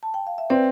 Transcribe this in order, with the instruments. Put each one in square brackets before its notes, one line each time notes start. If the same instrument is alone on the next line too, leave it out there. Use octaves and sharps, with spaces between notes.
[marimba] A5
G5
F5
E5
[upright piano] C4 [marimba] B4 D5